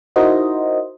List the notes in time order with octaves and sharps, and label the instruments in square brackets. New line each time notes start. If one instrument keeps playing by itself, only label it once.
[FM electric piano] D#4 E4 F#4 A#4 C5 D#5